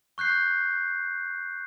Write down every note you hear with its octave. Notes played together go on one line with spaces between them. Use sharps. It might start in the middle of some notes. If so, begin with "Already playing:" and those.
C#6 F#6 G6 C7